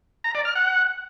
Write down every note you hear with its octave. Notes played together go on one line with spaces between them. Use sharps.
A#5
D5
F6
F#5